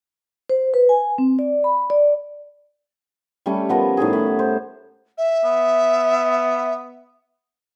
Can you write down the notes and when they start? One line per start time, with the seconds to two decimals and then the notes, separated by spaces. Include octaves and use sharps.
0.50 C5
0.74 B4
0.89 G#5
1.18 C4
1.39 D5
1.64 B5
1.90 D5
3.46 G3 A3 C#4
3.69 F3 B3 A#4
3.97 A2 D#3 G3 G#4
4.13 A2 B5
4.39 C5
5.17 E5
5.44 B3